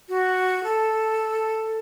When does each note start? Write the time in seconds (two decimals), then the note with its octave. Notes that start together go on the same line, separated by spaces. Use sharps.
0.09 F#4
0.63 A4